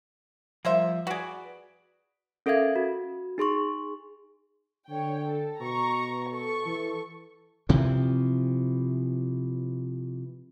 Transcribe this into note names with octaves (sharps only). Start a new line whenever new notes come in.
F3 G3 A#3 C5 E5
F#4 G#4 B4 D5
C#4 A4 A#4 E5 F5 G#6
F#4
D#4 G#4 C6 C#6
D3 C#5 G5
A4
B2 A#5 C#6
A4 C#6
E3
C3 E3 F3